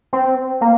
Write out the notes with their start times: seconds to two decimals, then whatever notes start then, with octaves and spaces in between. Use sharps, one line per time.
0.13 C4
0.61 A#3